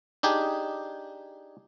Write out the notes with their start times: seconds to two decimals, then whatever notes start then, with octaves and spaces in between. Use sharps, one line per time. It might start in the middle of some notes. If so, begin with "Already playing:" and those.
0.23 D4 D#4 G4 G#4